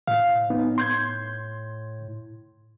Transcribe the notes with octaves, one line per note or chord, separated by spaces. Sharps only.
A2 F5
B3 D#4
C6 G6 G#6